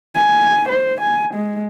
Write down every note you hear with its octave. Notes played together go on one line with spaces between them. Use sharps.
G#5
C5
G#5
G#3